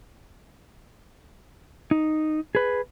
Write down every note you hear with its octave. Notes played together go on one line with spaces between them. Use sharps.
D#4
G#4 B4